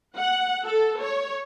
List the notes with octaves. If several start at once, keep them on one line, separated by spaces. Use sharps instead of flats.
F#5
A4
C#5